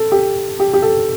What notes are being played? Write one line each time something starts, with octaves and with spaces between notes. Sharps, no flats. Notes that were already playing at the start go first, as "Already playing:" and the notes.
Already playing: A4
G4
G4
G4
A4